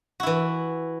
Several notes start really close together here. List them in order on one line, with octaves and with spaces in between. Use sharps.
F#4 E4 E3